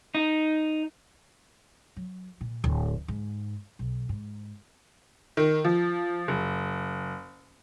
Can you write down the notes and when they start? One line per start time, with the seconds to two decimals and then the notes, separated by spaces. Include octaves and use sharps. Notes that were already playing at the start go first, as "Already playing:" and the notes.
0.15 D#4
1.96 F#3
2.41 A#2
2.64 D1
3.08 G#2
3.79 B1
4.09 G#2
5.37 D#3
5.65 F3
6.28 F#1